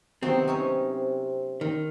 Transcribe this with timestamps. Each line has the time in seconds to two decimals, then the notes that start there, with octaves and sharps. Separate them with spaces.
0.23 C3 D#3 F#3 B3 C4
0.48 C#4 D#4 C#5
1.61 D#3